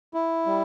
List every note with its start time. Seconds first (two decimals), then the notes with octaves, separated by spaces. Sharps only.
0.14 E4
0.46 G3